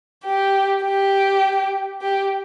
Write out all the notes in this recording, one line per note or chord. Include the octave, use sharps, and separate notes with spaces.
G4
G4
G4